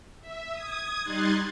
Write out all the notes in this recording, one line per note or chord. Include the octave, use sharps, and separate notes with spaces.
E5
D#6 G#6
G3 D#4 C6 F#6 G#6 A6